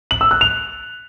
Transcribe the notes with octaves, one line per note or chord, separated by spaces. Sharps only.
F#7
E6
F#6
F7